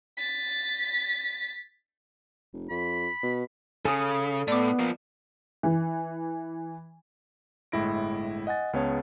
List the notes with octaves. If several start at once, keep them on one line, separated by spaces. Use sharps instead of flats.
A6 B6
F1
F2 B5
B2
C#3 A4 G#5 D#6
A2 B3 D5 D6
F3 A#3
E3
G1 A2 G#3 E4 A#6 D7
D#5 F#5 G#5 A6
C#2 B3 C#4 G#4 C#5 A5